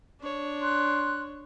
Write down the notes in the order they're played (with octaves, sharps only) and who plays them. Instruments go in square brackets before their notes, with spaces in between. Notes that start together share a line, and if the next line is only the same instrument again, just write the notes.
[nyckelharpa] D4 C#5
[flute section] C6 F#6